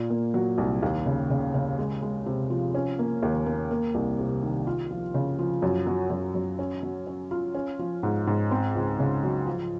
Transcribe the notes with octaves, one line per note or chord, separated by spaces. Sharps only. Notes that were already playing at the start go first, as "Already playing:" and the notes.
Already playing: A#2
A#3
F#3
C2
D#2
C#3
C#3
C#3
G#3
G#3
C3
F3
C#4
A#3
D#2
A#3
A#3
C2
C3
D#3
F4
F3
C#3
F3
F#2
F#3
F#2
F#2
C#4
F#3
C#4
F4
C#4
F3
G#2
G#2
C4
C#2
C#3
F#3
F3